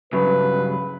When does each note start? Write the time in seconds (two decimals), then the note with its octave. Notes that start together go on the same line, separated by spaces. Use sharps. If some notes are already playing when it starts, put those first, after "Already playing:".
0.13 G2 C#3 F#3 B4